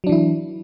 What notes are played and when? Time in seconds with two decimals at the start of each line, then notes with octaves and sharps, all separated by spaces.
0.04 F#3
0.07 D4
0.09 E3
0.12 E4